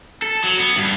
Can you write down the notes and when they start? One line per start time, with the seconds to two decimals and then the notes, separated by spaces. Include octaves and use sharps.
0.22 A4
0.44 F#3
0.59 B3
0.76 G2